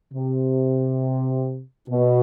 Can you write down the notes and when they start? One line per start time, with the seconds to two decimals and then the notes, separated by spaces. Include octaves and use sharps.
0.13 C3
1.90 B2